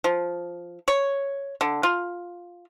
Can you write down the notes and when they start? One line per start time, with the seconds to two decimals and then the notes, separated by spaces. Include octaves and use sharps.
0.04 F3
0.88 C#5
1.61 D3
1.83 F4